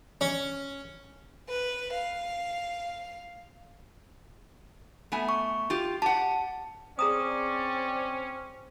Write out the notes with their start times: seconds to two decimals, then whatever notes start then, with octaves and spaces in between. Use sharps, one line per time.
0.21 C#4
1.49 B4
1.93 F5
5.12 A3 B3 G#5
5.29 C#6
5.70 F4 G4
6.02 G4 F#5 A5
6.99 C4 C#4 G#4 D5 A#5 D#6